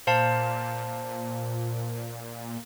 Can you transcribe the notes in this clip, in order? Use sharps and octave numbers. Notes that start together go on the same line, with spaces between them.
A#2 C5 F5 A5